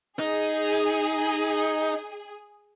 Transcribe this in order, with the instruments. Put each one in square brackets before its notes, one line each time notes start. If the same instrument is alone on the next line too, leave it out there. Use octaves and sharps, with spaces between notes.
[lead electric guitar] D#4 [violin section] G#4